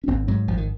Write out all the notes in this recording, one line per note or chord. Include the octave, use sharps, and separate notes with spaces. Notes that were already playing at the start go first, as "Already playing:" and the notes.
C#4
G#1 C4
G#2 F#3
G#1 F3
D#3